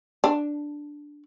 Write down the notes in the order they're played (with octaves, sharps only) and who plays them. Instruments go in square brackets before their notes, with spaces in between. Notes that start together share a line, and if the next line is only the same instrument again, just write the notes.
[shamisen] D4